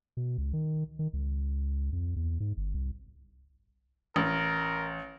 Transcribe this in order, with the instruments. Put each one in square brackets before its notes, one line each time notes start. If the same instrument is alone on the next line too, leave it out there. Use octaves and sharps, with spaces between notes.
[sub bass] B2
C#2
D#3
D#3
C#2
F2
E2
G#2
G1
C2
[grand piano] A1 [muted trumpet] A#4